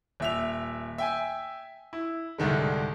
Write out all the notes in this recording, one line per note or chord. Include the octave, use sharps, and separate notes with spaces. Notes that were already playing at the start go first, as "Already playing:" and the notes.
D#1 E5 F7
E5 G5 G#5
E4
C2 G#2 D3 D#3 G#3